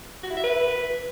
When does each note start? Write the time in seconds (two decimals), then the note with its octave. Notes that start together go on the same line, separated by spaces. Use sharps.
0.23 F#4
0.30 E4
0.37 E5
0.44 B4